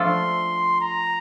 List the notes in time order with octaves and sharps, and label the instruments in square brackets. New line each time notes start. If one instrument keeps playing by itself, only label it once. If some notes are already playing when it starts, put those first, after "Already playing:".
Already playing: [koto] F3 A3 D4 F4 A4 [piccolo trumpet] C6
[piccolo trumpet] A#5